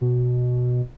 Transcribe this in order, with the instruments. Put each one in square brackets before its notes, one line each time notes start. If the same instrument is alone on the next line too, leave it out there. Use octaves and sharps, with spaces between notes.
[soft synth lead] B2